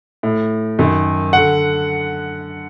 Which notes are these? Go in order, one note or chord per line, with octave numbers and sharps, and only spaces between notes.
A2
F#2 D#3
D3 F#5